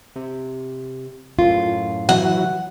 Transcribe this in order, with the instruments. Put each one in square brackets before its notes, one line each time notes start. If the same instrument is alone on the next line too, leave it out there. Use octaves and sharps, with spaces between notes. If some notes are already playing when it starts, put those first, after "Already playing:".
[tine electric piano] C3
[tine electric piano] F#2 A2 [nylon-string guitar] F4
[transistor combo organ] E3 F#3 [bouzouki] F#5